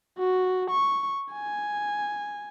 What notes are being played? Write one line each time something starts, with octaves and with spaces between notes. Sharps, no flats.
F#4
C#6
G#5